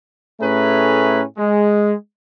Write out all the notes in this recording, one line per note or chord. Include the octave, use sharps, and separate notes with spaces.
A2 A3 C#4 G#4 B4 A#5
G#3